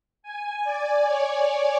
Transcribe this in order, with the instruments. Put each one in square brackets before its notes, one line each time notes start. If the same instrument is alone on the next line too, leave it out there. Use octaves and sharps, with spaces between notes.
[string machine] G#5
D5
C#5
C#5